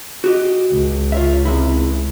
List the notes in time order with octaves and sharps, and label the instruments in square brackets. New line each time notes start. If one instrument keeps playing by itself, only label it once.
[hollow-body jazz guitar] F#4 G4 D#5
[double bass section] C#2
[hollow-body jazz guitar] F4 C#5 E5
C3 G#3 E4